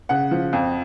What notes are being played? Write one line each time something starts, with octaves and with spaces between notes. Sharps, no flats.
C#3 F#5
F3
F2